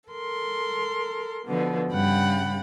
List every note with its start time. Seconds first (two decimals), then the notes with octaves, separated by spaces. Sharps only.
0.10 A4 A#4 C6
1.45 B2 D3 F3
1.91 G2 C#3 G3 F#5 G5 B5